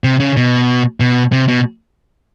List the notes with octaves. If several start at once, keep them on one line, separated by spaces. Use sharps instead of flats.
C3
C#3
B2
B2
C3
B2